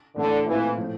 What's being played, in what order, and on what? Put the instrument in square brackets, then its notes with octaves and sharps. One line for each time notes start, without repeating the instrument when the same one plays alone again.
[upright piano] A2 E3 A3 [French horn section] D3
[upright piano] A#2 A3 C4 F4 [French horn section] E3
[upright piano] A2 F3 A3